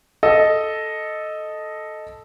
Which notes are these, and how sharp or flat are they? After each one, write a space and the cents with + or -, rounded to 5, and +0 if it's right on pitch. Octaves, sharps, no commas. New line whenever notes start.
A4 -5 D#5 +0